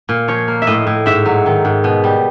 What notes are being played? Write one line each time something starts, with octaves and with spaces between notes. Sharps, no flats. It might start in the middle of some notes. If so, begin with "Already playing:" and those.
A#2
F3 C#5
A#3
E5
A2 D#5
A2
G#2 E5
F#3
D#3
G#2
B2
G3